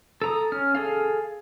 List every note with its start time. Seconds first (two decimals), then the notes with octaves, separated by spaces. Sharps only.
0.22 A4 A#5 D#6
0.52 C#4 F6
0.75 G#4 A4 F5